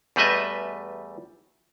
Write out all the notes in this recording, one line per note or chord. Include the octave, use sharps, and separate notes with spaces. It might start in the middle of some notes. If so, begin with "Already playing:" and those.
E2 G3 A3 B4 D#5 E5